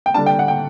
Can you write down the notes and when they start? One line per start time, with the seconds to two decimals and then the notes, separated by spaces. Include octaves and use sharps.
0.06 G5
0.14 D3 G3 D4 A5
0.26 G5
0.39 F#5
0.48 G5